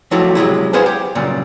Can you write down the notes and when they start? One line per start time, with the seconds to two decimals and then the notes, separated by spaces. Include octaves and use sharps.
0.11 F3 F#3 A3 E4 F#4 G4
0.35 C3 F#3 G#3 E4
0.73 G#4 B4 C5 F5 F#5 G#5
0.86 G4
1.15 F#2 A#2 C#3 G3